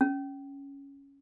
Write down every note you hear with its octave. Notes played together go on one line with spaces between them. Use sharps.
C#4